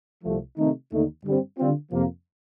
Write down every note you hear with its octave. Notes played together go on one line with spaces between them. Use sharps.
C2 C3 F3 A3
C3 D#3 A3 D#4
D#2 D3 A3 D#4
G2 D3 G3 C4
D3 G3 C4 F4
F2 C3 F3 A#3